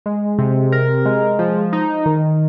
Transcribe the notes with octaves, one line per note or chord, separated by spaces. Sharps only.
G#3
C3
A#4
G#3
F3
D#4
D#3